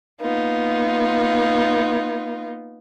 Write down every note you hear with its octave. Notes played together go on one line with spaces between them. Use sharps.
A#3 B3 D#4 F4